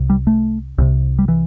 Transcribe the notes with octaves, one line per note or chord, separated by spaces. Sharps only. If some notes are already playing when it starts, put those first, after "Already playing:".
Already playing: C2 C3
G3
A3
C2 C3
G3
E3